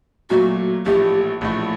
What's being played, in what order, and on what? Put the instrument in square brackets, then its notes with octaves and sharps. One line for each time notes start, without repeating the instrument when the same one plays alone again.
[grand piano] A#2 F#3 A3 [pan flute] F#4
[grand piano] A#1 A2 E3 A3 [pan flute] G4
[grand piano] A#1 A2 E3 A3